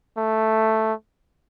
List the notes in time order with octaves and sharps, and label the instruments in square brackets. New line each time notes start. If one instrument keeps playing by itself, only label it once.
[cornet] A3